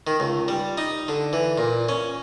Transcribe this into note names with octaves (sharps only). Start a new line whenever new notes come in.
D#3
C#2
G3
D#4
D3
E3
A#2
C#4